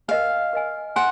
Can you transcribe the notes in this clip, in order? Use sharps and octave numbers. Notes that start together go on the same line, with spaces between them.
A#4 D#5 F5 G#5
A#4 D#5 G#5
F#5 G#5 C6